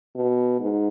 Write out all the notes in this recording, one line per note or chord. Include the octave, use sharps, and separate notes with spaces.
B2
G#2